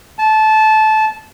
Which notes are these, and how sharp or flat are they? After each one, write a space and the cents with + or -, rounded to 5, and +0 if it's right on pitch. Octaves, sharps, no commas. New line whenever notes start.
A5 -20